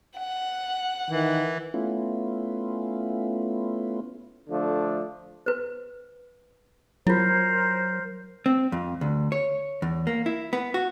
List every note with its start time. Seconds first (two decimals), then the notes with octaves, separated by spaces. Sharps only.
0.19 F#5
1.10 D#3 E3
1.74 A3 B3 C#4 E4 F4
4.48 D3 F3 A3 D4
5.46 B4 C5
7.07 F#3 E4 F4 A#4 C5
8.46 C4
8.72 F2
9.01 D2
9.32 C#5
9.82 E2
10.07 A#3
10.26 E4
10.53 B3
10.74 F#4